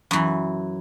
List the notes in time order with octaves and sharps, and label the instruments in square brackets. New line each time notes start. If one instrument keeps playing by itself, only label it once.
[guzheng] F#2 E3